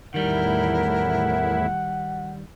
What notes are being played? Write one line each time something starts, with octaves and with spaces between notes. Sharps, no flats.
E2 A2 D#3 G3 E4 A#4 F#5